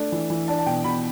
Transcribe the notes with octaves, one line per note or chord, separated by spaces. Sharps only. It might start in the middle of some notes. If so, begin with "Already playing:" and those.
Already playing: A3 D4
E3
E3
D4 A5
A5
B2 G5
B2 B5